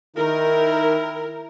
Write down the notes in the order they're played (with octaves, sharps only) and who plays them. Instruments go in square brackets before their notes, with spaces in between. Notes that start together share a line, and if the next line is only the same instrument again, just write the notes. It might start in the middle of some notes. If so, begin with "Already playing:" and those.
[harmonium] D#3 D#4 [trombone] E4 [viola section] A#4